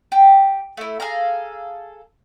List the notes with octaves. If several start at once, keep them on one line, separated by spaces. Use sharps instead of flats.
G4
A3 E4
G#4 A4 F5 A#5